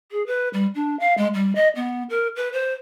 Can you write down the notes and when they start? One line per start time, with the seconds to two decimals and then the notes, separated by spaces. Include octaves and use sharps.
0.12 G#4
0.27 B4
0.53 G3
0.75 D4
1.00 F5
1.18 G#3
1.34 G3
1.55 D#5
1.76 B3
2.10 A#4
2.36 B4
2.53 C5